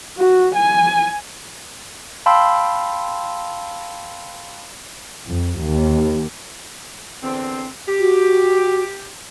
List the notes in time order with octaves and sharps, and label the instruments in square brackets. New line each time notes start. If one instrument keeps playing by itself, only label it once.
[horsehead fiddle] F#4
G#5
[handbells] F5 G5 A5 B5 C6 E6
[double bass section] F2
D#2
[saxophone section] E2 D3 C4
G4
[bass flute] F#4